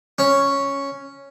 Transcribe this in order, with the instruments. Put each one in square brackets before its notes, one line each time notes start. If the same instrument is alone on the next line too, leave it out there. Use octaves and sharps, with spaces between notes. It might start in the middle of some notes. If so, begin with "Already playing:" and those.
[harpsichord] C#4